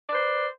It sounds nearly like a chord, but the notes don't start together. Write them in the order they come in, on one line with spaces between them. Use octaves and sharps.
D5 B4 C5